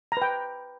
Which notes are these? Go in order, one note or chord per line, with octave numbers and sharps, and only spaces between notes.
B4 G5 A#5